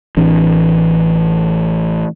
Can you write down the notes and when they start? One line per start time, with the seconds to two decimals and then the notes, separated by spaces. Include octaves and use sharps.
0.17 A1 E3 C4 D4